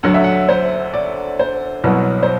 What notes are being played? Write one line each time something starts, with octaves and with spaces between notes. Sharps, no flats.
D2 D3 F#3 F#5
E5
F#5
C5
D5
C5
C2 B2 F#3 B4
C5